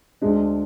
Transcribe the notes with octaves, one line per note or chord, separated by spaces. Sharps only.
D2 D3 G#3 D4